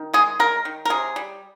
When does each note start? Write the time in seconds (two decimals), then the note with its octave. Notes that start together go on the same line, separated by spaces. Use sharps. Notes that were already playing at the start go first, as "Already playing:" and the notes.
Already playing: D#3
0.14 G#3 G#4
0.39 G#3 A#4
0.65 D#3
0.85 A#4
0.90 C3 G#4
1.16 G3